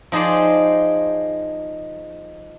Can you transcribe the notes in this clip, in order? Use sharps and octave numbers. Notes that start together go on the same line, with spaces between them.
F3 D#4 G#4 C5 D5